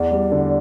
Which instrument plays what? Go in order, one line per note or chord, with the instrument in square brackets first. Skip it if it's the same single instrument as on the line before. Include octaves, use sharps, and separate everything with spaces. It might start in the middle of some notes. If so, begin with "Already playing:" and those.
Already playing: [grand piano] E2 [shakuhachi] D5
[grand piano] G3
D3